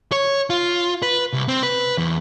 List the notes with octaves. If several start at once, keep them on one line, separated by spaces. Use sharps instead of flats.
C#5
F4
B4
C2
C4
B4
E2